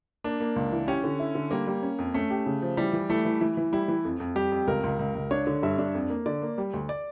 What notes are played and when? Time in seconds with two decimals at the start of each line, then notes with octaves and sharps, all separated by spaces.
0.24 A#3 D4
0.40 A#3
0.56 C#2
0.72 E3
0.87 C#4 G4
1.04 D3
1.19 E4
1.35 D3
1.51 G3 A#3
1.67 G3
1.83 C#4
1.99 F2
2.14 A3 C#4
2.30 G4
2.46 C#3
2.62 F3
2.77 E3 G3
2.93 E3
3.10 E3 A3
3.25 E3
3.41 E3
3.57 E3
3.72 G3 E4
3.88 E3
4.05 F2
4.20 F2
4.36 G3 G4
4.52 F2
4.67 C#2 A#4
4.83 C#2
4.99 C#2
5.15 C#2
5.31 D4 C#5
5.47 D3
5.63 G2 E5
5.78 D4
5.95 F2
6.10 A#3
6.26 D3 D5
6.42 A#3
6.58 G3
6.73 D2
6.89 D5